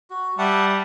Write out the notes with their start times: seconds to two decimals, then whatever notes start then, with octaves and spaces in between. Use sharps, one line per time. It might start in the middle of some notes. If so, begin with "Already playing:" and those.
0.10 F#4
0.38 G3 E5 F#5 A5